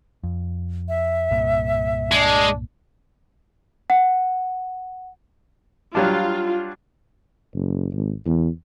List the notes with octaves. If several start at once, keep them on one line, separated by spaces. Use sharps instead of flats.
F2
E5
C2 G2 A#2
G#3 D4
F#5
F#3 G3 D4 F4
F#1
G#1
E2